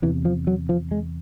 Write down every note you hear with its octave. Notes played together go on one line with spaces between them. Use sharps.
E2 C3 E3
F3
F#3
F3
G#3